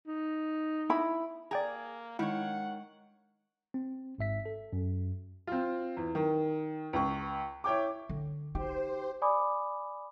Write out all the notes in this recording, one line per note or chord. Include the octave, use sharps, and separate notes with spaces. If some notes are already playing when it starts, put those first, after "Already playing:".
D#4
E4 B5
A#3 G#4 D5 G5 A#5
D#3 G#3 E4 C#5 D#5 F#5
C4
G#1 G#2 E5 B6
A4
F#2
C4 F4
E2
D#3
C#2 C#6
E4 C#5 G5 D6
D3
D#4 G4 C5
D5 G#5 B5 D6 D#6